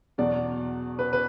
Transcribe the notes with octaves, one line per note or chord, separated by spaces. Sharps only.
E2 B2 F#3 D5
B4
B4